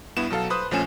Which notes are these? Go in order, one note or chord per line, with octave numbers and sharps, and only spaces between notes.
G2 B3 E4 E7
B2 F#3 A4 F5
B4 C5 D#6 F#6
A#1 F3 A3 C#4 G#5 E7